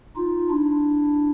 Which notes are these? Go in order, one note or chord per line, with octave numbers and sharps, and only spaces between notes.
D#4 F4
D4 E4